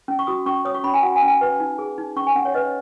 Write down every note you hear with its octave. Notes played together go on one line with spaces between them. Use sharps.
C#4
C#6
F#4 D#6
C#4 C#6
C#5 D#6
C#6
C#4 B5
G#5
F#4 F#5
G#5
C#4
G#5
B4
D#4
G#4
D#4
C#4 C#6
G#5
C#4 F#5
C#5
B4 D#5